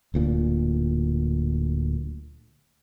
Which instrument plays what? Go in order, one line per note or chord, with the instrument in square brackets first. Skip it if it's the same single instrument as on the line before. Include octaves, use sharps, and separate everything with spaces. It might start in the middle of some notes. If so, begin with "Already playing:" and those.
[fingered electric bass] D1 D2 A#2